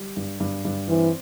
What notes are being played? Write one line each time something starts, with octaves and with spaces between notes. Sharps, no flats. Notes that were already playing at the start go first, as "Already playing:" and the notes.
Already playing: G3
G2
G2
G2
E3 C4